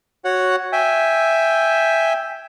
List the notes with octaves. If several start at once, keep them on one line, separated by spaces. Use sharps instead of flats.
F#4 C#5 F#5
E5 G5 G#5